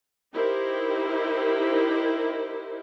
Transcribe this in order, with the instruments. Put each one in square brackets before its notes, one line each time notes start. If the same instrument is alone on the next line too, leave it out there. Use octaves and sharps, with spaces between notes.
[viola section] D#4 E4 G4 A#4 C5